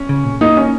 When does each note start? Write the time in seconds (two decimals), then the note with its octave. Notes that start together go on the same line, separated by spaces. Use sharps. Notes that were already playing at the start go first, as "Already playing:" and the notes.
Already playing: C#4
0.09 C#3
0.25 A#2
0.41 A#3 D#4
0.57 C#4